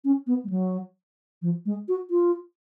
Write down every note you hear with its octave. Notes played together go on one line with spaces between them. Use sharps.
C#4
B3
G#3
F#3
F3
G#3
F#4
F4